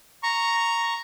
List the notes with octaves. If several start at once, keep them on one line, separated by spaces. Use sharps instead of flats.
A#5 C#6